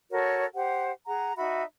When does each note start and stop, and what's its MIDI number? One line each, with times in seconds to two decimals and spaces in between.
0.11 0.45 66
0.11 0.45 69
0.11 0.45 70
0.11 0.45 73
0.55 0.90 67
0.55 0.90 72
0.55 0.90 78
1.06 1.33 68
1.06 1.33 78
1.06 1.33 82
1.36 1.63 63
1.36 1.63 66
1.36 1.63 76
1.36 1.63 83